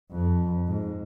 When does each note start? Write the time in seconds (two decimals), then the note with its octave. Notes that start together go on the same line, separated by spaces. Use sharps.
0.11 F2
0.68 G#2